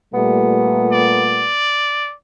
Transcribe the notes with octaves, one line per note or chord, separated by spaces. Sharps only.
A#2 G3 A3 B3
D5